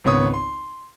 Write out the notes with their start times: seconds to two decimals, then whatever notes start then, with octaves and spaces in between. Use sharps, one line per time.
0.04 G#1 C#2 B3 C#5 D#6
0.34 C6